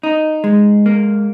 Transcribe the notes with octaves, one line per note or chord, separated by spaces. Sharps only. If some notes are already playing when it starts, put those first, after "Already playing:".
D#4
G#3
A#3